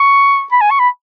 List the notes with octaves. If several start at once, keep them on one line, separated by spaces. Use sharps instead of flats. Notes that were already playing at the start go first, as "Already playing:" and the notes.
Already playing: C#6
B5
G#5
C#6
B5